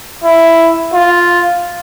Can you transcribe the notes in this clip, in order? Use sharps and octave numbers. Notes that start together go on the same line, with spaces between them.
E4
F4